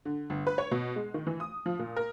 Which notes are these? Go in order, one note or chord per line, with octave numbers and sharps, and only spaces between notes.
D3
G1
B4
C#5
B2
G#3
D#3
E3
D#6
F3
A#2
A#4